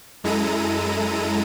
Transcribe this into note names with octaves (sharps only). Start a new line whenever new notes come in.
F#2 G#3 E4 A4 A#5 D#7